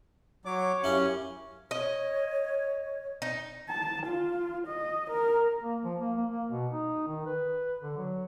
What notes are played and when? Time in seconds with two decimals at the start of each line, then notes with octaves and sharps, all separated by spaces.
0.45 F#3 C#5 D6
0.84 F#2 C#4 E4 G4 F5
1.71 C#5 D#5
3.22 D#4
3.69 A5
4.06 F4
4.67 D#5
5.10 A#4
5.64 A#3
5.84 F3
6.00 A#3
6.17 A#3
6.31 A#3
6.50 B2
6.72 D#4
7.08 D#3
7.26 B4
7.81 D3
7.98 F#3